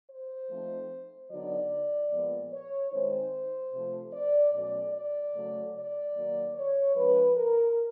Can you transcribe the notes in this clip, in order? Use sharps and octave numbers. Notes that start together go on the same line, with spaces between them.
C5
F3 A3 C4 D#4
D3 F#3 B3 D#4 D5
A#2 F3 G#3 B3
C#5
D#3 G#3 C4 D#4 C5
C3 F3 A3
D5
B2 F#3 A3 C#4 D5
D5
C#3 F#3 A3
D5
D#3 F#3 A#3
C#5
F3 G#3 C#4 B4
A#4